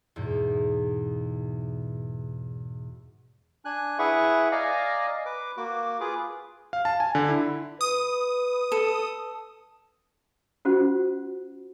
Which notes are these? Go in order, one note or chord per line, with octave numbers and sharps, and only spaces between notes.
E2 G#2 B2
D4 G#5 F#6
E4 G#4 B4 E5 F#5 C#6
D5 D#5 F5 G#5 A#5
B4 D6
A#3 F#4 D6
F4 G#4 B4 D6
F5
A5
G#5
D3
E4
B4 D#6
A4
C#4 F4 F#4 C5 F#5